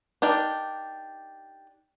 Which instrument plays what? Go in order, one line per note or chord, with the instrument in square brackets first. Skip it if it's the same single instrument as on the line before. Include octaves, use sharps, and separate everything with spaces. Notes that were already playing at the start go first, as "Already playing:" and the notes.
[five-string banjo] D4 D#4 G4 A#4 D5